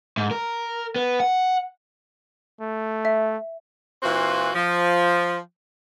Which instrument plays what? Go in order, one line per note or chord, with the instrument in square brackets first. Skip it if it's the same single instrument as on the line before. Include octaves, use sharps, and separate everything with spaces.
[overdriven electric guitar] G#2
A#4
B3
F#5
[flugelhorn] A3
[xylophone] E5
[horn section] A#2 E3 C4 F4 F#4
F3